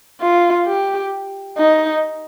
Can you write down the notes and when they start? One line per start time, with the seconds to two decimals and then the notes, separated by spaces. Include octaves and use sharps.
0.21 F4
0.67 G4
1.58 D#4